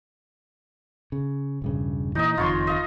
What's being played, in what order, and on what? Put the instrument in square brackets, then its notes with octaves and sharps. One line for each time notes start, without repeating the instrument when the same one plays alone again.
[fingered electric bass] C#3
E1 G2 C#3
[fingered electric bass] A#2 E3 [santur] D#4 D#5
[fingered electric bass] F#1 F2 D#3 [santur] F4 C#5 C6
[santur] D#5 F5